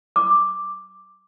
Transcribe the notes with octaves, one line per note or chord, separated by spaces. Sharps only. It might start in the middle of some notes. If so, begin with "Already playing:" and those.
D6